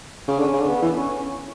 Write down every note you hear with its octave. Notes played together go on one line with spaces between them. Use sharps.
C#3
D3 C#4
C#3
D3
B3
E3
C#4